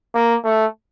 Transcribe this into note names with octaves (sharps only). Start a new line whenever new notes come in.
A#3
A3